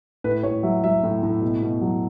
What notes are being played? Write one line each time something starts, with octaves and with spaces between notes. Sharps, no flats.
A2 B4
A2 C#5
F#3 E5
F#3 E5
A2
A2
B2
B2
F#3